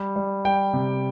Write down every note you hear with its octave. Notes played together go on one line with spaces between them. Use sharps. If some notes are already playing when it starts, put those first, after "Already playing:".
Already playing: G3
G3
G3 G5
C3